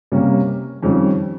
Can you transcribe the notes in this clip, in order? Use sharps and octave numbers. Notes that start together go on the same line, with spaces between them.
C3 G3 A#3 C#4
F2 D#3 G3 C#4